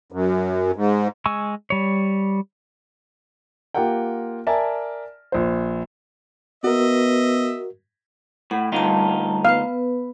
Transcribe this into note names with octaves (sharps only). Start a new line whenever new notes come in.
F#2
G#2
G#3 G#5 C#6 E6
G3 C#5
A#3 F4 G4 A#4 F#5 G5
A#4 D5 E5 G#5 A5
A#1 C5
B3 F#4 A#4 D#5 E5
A2 F#5
D2 G3 D#4 F4 A5
B3 B4 F5